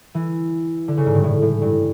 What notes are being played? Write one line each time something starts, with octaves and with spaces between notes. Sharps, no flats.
E3
D3
C#3
G#2
G2
A2
A2
G2